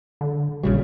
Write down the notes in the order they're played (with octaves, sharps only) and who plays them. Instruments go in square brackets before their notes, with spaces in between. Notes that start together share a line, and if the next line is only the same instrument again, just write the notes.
[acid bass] D3
[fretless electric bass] A#1 C#3 G3 [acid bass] F#4